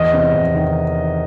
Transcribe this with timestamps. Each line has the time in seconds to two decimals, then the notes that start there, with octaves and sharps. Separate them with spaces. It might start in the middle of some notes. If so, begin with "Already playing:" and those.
Already playing: E2 D#5
0.13 C3
0.34 E2
0.55 D#3